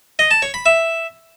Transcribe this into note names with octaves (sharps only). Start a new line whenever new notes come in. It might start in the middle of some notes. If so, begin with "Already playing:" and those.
D#5
A5
C#5
B5
E5